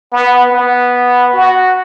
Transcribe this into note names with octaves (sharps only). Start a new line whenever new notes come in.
B3
B3
F#4